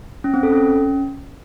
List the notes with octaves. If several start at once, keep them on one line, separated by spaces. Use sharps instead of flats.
C#4
C4
A4
C#4